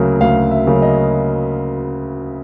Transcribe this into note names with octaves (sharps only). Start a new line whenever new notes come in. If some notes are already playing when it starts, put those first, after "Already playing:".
Already playing: D2 C#3 F#3 A#3
D2 F5
E5
C#3 F#3 A#3
D#5